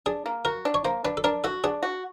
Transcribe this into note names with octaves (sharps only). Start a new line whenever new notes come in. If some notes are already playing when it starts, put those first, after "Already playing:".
D4 G#4
A#3
F#4 A#4
D4
C#5
A#3 C5
D4 B4
A4
D4 A#4
F#4 A4
D4 G#4
F#4